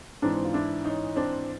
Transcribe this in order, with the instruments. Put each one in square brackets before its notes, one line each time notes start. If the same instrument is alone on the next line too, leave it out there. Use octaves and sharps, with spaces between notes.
[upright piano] G#2 E3 C4 D4
F4
D4 E4
C#4 D#4
C4 D4